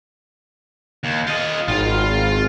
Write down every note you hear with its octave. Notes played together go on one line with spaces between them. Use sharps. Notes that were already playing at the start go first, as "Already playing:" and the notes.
D#2
F4 D#5
G#1 F4